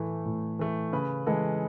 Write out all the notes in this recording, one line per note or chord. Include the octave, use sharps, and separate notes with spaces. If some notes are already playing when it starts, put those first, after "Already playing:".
Already playing: A2 E3 A3 A4
A2
E3 A3
C#3 B4
E3 G#3 A4